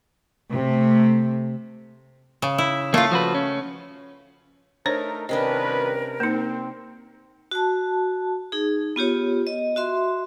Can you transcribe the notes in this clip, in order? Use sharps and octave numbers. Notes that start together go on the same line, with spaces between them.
C3 A3
C#3
E4
A3 A#3 F4 F5
F3 F#4 B4
C#4
A3 D4 D#4 A#4 C5 C#5
C2 C3 D#3 C#4 D4 A#4 B4 D#5
A#3 C4 D#4
F#4 A5
D#4 G#4
B3 F4 G4 C#5
D#5
F#4 E5 C6